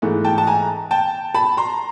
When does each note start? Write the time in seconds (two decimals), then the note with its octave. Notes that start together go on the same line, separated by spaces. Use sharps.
0.02 G#2 E3 A3
0.24 G5 A5
0.38 A5
0.47 G#5 A#5
0.91 G5 A5
1.34 A5 B5
1.57 A#5 C6